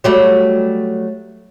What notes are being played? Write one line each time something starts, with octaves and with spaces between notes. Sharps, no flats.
F#3 G3 A3